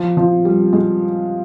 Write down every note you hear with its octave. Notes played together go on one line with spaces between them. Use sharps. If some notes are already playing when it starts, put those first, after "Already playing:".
Already playing: F3
F3
G3
G#3